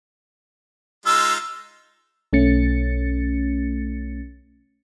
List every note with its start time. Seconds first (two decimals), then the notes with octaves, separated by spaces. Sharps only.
1.06 G#3 D#4 F4 E6
2.33 B1 A3 C#4 A6 C#7